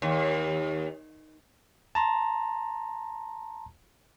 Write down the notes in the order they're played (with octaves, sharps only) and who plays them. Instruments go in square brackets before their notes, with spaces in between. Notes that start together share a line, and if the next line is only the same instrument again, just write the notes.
[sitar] D#2
[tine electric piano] A5 A#5 C6